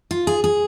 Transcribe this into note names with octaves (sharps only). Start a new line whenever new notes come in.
F4
G#4
G#4